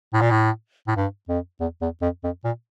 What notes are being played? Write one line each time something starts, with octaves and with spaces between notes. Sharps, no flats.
A2
A#2
A2
A2
G2
F2
E2
E2
F2
F2
A#2